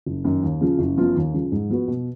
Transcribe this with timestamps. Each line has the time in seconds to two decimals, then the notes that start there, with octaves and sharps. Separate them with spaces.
0.06 F#1
0.24 F#2 D#3
0.43 D#2
0.61 C#3 F3
0.79 F#1
0.97 F#2 F3 B3 F4
1.15 D#2
1.33 C#3 F3
1.52 G#2
1.69 F3 B3 F#4 B4
1.88 B2